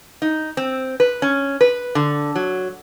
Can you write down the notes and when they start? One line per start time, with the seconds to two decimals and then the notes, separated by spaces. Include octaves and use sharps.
0.22 D#4
0.57 C4
1.00 B4
1.22 C#4
1.61 B4
1.95 D3
2.35 F#3